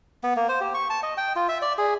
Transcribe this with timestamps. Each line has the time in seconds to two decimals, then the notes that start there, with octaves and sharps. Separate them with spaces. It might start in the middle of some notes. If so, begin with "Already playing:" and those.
0.23 B3
0.36 A#3
0.49 C5
0.61 G4
0.74 C#6
0.90 A5
1.03 D#5
1.17 G5
1.36 F4
1.48 E5
1.62 D5
1.78 G#4